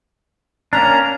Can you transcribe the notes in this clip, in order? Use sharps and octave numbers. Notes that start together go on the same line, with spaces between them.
A#3 C#4 D4 A#5